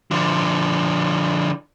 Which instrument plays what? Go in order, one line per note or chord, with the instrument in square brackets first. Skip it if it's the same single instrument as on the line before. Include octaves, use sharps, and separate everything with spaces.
[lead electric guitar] D3 F3